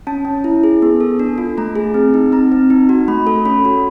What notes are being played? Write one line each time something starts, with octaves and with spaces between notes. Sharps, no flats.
C#4 A5
C#4
E4
G#4
B3
A4
D4
F4
A3 A#5
G#4
C4
D#4
C4 A#5
C4
D#4
F#4
A3 B5
A4
C#4 B5
F#4